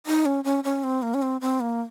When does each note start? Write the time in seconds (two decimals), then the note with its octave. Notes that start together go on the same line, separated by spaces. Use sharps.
0.06 D#4
0.26 C#4
0.44 C#4
0.64 C#4
0.84 C4
1.02 A#3
1.14 C#4
1.22 C4
1.41 C4
1.60 A#3